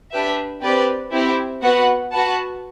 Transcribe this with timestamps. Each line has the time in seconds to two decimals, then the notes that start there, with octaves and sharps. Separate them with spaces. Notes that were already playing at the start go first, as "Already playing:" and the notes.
0.11 D4 G4 B4 E5
0.62 C4 G4 B4 D5
1.12 C4 E4 G4
1.62 B3 F#4 B4 F#5
2.12 F#4 B4 F#5 A5